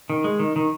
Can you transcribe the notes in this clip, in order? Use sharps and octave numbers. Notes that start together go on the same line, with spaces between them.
D#3
G#3
D#3
D#3